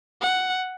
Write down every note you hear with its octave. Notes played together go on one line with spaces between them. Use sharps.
F#5